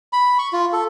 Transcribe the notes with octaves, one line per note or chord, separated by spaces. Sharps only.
B5
C#6
F4
A4